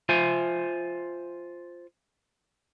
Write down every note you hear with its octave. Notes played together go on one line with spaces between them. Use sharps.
F4 C5 E5 G#5